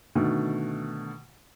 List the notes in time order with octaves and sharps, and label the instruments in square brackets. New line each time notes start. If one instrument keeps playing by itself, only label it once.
[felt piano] B2 D3 D#3 A3